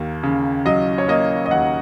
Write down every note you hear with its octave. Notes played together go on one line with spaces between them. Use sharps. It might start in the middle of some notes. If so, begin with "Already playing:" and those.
Already playing: D#2 A#3
C#3
F#3 D#5
C#5
A#3 D#5
D#5
D#2 F#5